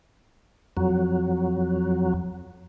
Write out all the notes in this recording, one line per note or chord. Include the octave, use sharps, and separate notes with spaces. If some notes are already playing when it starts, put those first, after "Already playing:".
F2 F#3